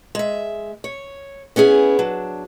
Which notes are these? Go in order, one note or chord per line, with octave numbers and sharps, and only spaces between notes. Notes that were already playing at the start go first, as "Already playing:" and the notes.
G#3 E5
C#5
B3 C#4 E4 G#4
F#3 D4